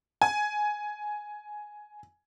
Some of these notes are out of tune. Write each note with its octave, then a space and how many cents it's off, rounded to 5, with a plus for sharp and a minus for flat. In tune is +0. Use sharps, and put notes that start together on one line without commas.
G#5 +10